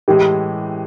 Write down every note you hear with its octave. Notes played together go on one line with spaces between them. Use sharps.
A2 E3 G#3 G4